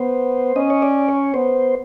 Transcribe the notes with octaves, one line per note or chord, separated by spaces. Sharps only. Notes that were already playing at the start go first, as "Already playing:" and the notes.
Already playing: B3 C5
C#4 D#5
C#5
D5
C#5
B3 C5